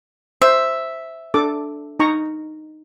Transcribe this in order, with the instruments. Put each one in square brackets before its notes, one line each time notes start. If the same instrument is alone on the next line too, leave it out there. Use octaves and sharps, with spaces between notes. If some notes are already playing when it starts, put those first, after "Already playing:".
[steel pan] C5 [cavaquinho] E5
[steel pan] D4 A4 D6
D#4 A#5 C#6